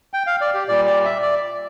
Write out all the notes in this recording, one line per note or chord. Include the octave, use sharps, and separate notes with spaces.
G5
F5
D5
G4
A#2 G3 D5
D5
E5
D5